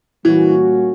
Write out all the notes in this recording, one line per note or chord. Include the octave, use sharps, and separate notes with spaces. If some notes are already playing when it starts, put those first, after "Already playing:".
A#2 E3 G3 A#3 C#4 F#4